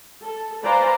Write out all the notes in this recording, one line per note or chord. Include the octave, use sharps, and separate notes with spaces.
A4
B4 C5 D5 F5 G#5 A#5